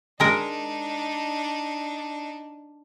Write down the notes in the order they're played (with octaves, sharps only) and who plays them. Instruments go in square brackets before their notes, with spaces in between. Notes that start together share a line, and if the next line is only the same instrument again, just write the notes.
[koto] G#3 A#4 [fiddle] D4 D#4